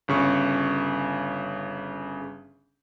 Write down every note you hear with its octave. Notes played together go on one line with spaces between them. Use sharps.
G1 C#3 C#6